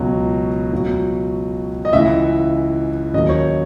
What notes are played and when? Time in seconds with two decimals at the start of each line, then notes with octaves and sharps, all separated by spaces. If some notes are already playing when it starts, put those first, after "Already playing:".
Already playing: C#2 B2 F#3
0.73 C#2 B2 F#3
1.85 D#5
1.93 C#2 C#3 E3 E5
3.13 D#2 C#3 F#3 D#5
3.29 C#5